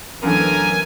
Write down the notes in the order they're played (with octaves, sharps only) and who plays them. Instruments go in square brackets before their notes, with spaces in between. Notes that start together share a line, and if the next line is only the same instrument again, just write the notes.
[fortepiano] F#2 D3 A3 [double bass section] E3 F#3 B3 [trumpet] A#4 [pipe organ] G#5